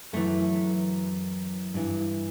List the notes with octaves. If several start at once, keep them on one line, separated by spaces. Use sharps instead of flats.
F#2 E3 A3
G2 E3